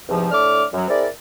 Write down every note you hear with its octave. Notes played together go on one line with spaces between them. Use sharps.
E2 G#2 C3 F3
A2 A3 D4 D6 F6
F#2 F#3
C4 E4 G#4 A#4 D5